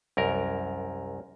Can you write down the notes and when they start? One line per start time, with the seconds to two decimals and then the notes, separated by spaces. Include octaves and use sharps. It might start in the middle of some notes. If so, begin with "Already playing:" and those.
0.17 C2 F#2 A#4